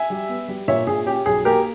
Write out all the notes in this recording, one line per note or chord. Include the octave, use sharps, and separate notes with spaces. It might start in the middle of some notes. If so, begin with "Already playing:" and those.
Already playing: E5 G#5
G3
B3
G3
A#2 C#5 E5
A#2 G#4
C#4 G4
B1 G#4
A#3 G4 A#4